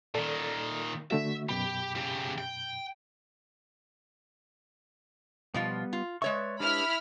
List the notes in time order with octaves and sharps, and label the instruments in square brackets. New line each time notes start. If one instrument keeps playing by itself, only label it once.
[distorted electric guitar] A#2 D#3 [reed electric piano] A4 D5
[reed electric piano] D3 A3 F#4 [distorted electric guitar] E5
[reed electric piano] F#2 B2 B5 [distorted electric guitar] G4
[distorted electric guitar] C#3 G4
G5
[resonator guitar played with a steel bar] B2 F3 F4 [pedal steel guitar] G3 B3
[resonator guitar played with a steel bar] F4
[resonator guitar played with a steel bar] G#3 C#5 E5 [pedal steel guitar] B4 D5 C#6
[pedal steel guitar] D4 G4 B4 [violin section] E4 B5 F6